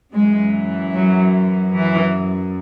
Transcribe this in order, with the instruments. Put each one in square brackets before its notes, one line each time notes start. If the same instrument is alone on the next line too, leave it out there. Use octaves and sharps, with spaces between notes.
[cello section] F#2 E3 G#3
F#3
E3